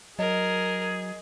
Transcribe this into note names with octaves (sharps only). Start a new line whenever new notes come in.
F#3 G#4 A#4 D#5